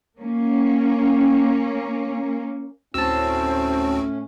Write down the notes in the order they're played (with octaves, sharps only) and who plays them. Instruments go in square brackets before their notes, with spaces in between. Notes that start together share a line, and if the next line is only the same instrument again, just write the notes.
[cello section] A#3 C#4
[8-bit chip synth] D2 C4 F#4 [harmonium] A2 C#4 [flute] C5 [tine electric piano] A5 E6